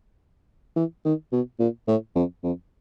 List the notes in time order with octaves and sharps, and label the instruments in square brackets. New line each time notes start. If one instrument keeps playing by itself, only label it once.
[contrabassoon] E3
D#3
B2
A#2
A2
F2
F2